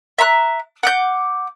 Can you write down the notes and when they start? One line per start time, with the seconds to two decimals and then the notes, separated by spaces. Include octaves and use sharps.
0.18 E5 A#5 B5 F#6
0.83 F#5 D6 G6